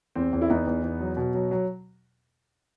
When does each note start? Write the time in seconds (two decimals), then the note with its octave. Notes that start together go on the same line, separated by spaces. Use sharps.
0.15 E2 C4
0.33 E2
0.41 E4
0.50 E2 B3 D#4
0.67 E2
0.83 E2
1.00 F#3
1.17 B2
1.34 F#3
1.51 F#3